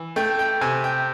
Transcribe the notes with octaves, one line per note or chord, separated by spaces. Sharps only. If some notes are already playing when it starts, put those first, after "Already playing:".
Already playing: E3
A3 G5
G5
C3 G#5
G5